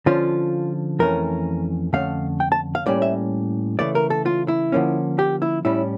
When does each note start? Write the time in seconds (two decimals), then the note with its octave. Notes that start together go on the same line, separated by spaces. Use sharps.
0.06 D3 F3 C#4 F4
0.99 F2 E3 A3 C#4 A#4
1.93 F2 D3 A3 C#4 F5
2.40 G5
2.52 A5
2.75 F5
2.86 A2 G3 A#3 C#4 D5
3.02 E5
3.79 C#3 E3 A3 D5
3.95 A#4
4.10 A4
4.26 F4
4.48 E4
4.72 D3 F3 A#3 C#4
5.19 G4
5.42 E4
5.65 A2 G3 C#4 E4